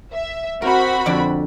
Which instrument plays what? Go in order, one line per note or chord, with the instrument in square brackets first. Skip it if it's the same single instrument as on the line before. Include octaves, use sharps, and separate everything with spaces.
[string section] E5
[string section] C4 F#4 B5 [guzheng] A#4
[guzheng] F2 D3 D5